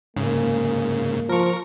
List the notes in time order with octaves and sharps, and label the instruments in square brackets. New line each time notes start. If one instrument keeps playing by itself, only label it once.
[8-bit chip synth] G#2 C#3 [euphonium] A#3
[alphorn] F3 [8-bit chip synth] A#4 C#6